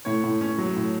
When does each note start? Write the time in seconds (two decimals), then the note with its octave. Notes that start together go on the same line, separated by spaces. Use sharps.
0.05 A2 C#5
0.24 A2
0.41 C#4
0.58 F#3
0.76 A2